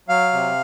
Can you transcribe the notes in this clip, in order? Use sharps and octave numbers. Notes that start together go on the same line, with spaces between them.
F#3 F5
C3